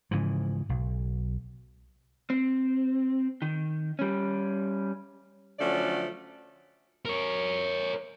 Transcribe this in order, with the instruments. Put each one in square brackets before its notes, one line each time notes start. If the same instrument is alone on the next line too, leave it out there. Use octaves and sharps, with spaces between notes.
[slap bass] G#2 C#3 E3 F3
B1
[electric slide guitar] C4
D#3
G3 C#4
[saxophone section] D3 F3 F#3 A3 C#4 D5
[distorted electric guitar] A#4 C#5